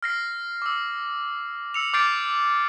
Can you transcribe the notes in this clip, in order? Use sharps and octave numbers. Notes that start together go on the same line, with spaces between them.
F6 A#6 C7
D6 E6
E6 C#7 F7
D6 F6 G6 A6 C7 D7